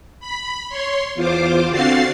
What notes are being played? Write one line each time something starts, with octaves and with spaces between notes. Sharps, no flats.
B5
C#5 C6
E2 F4 C5 D6
D3 C4 F#4 F5 A6 C7